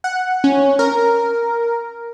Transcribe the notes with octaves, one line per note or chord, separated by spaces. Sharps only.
F#5
C#4
A#4